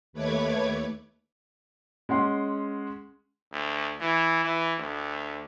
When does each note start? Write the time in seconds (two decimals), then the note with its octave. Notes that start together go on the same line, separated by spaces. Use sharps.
0.13 D#2 A3 B4 C#5 D6 G#6
2.09 G#3 C#4 F#5 C6
3.53 D2
4.00 E3
4.44 E3
4.78 D2